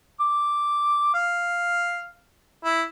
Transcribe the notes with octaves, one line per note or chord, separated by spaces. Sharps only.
D6
F5
E4